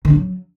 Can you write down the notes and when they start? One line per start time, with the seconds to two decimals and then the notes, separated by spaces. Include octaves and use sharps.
0.05 D#3
0.10 D4
0.15 F#3